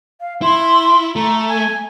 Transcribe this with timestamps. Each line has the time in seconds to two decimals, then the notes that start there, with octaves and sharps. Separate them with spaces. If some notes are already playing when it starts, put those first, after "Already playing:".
0.21 F5
0.42 E4 C6
1.16 A3 A#5
1.48 G#5